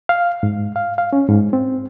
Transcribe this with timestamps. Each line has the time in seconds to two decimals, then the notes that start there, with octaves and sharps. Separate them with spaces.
0.09 F5
0.43 G#2
0.76 F5
0.98 F5
1.13 C#4
1.29 G#2
1.53 C4